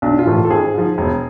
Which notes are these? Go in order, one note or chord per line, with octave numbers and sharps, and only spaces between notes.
B1 D4
F4
A2 E3 A3
F4
A4
G#1 G#4
G#2 F3
E1